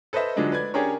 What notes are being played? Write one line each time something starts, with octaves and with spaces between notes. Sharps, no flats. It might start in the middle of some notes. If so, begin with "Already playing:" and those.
A4 B4 C5 D#5 E5
D3 F3 F#3 G#3 D4 D#4
B4 D5 G#6
C#4 D4 G4 G#4 A#4 C#5